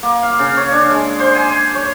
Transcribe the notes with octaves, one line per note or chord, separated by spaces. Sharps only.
A#3
F5
C#3
C#5
D4
G#3
C5
G#5
C#5